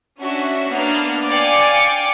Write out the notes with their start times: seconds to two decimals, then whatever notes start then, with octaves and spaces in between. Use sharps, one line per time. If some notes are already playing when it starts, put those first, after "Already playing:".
0.19 C#4 D4 F#4 E5
0.72 A#3 B3 D4 F6
1.29 D5 F5 G5 G#5 C#7